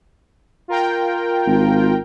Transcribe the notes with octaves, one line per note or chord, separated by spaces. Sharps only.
F4 A#4 G5
G#1